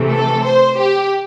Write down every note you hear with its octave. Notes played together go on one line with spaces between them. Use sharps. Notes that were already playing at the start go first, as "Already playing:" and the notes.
Already playing: C3 E3 A3
A4
C5
G4